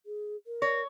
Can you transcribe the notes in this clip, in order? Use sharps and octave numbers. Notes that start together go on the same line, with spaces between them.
G#4
A#4
C#5 A#6